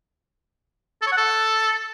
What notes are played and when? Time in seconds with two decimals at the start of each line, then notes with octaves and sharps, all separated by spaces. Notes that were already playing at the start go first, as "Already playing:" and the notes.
1.02 A4
1.07 C#5
1.12 F#5
1.17 A4